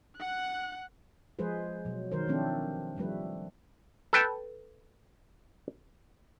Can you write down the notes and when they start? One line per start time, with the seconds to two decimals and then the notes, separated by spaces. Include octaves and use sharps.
0.18 F#5 F#6
1.39 F3 G#3 G#4 B4 C5
1.85 B2 F#3
2.12 D#3 F#3 A#4 C5
2.28 D#3 F3 A3 C4 D4
2.97 F3 G3 A3 B4
4.13 A4 B4 G5 A5